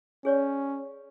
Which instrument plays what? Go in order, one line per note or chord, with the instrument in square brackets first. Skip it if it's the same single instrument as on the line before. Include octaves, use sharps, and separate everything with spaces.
[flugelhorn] C#4 [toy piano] G#4 C#5 D5